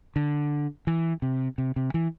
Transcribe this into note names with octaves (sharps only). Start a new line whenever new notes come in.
D3
E3
C3
C3
C3
E3